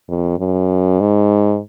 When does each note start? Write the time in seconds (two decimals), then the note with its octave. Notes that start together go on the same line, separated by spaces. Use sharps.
0.08 F2
0.39 F#2
1.01 G#2